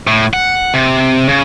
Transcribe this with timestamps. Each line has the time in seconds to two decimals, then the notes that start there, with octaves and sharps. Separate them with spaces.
0.07 A2
0.33 F#5
0.74 C3
1.29 C#3